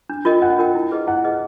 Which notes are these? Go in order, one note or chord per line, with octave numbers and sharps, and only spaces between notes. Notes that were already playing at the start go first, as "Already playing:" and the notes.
D4
F4 A#4 D#5 G5
D4 F#5
F4 A#4 D#5 G5
E4
G#4 B4 D#5
E4 F#5
G#4 B4 D#5